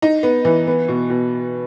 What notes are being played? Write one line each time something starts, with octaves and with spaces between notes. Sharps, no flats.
D#4
B3
E3
B3
B2
B2